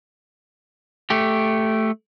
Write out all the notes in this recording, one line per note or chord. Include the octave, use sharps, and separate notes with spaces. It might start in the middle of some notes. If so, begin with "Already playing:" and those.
A3 G4